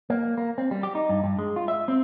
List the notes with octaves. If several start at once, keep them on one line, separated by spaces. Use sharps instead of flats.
A#3
A#3
C4
G3
G4
D#4
G2
G2
G#3
F4
E5
C4